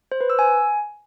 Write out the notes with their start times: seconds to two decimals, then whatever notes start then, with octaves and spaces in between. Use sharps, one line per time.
0.12 C5
0.21 B4
0.30 E6
0.39 G#5